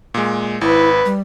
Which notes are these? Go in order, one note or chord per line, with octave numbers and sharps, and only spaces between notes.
A#2 G#3
G#1 E4 B4
G3